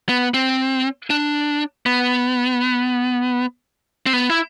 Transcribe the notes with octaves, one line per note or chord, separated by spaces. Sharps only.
B3
C4
D4
B3
C4
B3
E4